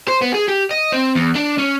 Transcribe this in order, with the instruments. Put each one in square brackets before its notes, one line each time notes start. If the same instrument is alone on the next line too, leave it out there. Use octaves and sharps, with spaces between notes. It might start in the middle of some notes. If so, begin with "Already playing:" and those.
[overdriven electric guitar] C5
B3
G#4
G4
D#5
C4
E2
D4
C#4